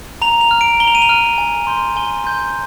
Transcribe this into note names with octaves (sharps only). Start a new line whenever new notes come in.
A#5 F7
F7
F6
D7
A#5 G7
F7
D#7
F7
F6
G#5
C6 G6
G#5 G7
C6 G6